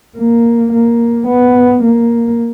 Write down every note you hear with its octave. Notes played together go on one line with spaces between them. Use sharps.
A#3
A#3
B3
A#3